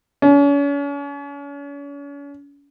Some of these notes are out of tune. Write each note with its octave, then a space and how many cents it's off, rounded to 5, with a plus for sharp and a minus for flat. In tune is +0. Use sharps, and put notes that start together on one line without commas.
C#4 +40